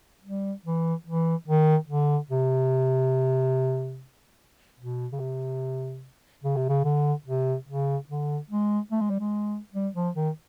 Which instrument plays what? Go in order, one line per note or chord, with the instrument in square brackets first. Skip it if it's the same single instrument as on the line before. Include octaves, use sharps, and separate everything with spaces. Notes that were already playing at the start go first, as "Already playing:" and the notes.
[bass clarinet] G3
E3
E3
D#3
D3
C3
B2
C#3
C3
C#3
C3
C#3
D3
C3
C#3
D3
G#3
A3
G#3
G3
G#3
G3
F3
D#3